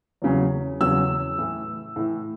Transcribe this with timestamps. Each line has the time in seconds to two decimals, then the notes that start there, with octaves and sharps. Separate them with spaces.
0.22 E2 C#3 F#3
0.80 E2 C#3 F#3 E6
1.38 A2 E3
1.96 A2 E3